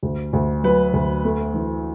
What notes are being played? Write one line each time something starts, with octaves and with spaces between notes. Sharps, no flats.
D2
D2
F#3 B4
D2
A3
E3